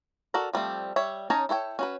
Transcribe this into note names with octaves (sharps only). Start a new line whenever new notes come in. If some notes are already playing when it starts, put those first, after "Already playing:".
F#4 A4 A#4 D5
F3 G3 A3 C4
G3 C#5 E5
C#4 D#4 C#5 A5 A#5
E4 A4 C#5 G5
C#4 F#4 B4